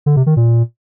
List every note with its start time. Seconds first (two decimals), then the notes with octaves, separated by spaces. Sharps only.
0.06 D3
0.16 C3
0.26 D#3
0.37 A#2